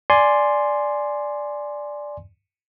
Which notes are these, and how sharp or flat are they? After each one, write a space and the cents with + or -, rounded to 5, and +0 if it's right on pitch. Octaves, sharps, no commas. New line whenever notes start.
D5 +0 G#5 +5 C6 +0